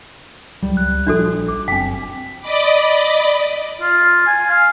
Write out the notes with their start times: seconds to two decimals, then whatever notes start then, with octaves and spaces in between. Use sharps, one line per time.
0.62 C#2 F#3 G3
0.77 C#2 F#6
1.07 A#1 F3 D4 F#4 A4
1.48 D6
1.68 F#1 C4 G5 G#5 B6
2.40 D5 D#5 B5 D6
3.81 F4
4.27 G#5
4.50 F5